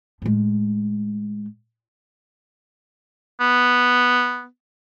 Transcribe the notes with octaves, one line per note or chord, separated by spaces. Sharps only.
A2 G#3
B3